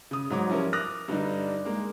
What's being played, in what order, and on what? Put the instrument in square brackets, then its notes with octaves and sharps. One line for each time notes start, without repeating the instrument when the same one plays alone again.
[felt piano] C#3 D#6
G#2 F#3 C#5 D6
F3 G3 C#4 E4 F4 A#4
D6 D#6 F6 F#6 A#6
G2 D3 G3 D4 D#4
G#3 A#3